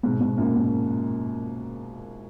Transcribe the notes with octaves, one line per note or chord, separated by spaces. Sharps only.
G#2 B2
G#2 B2
F#2 A#2
G#2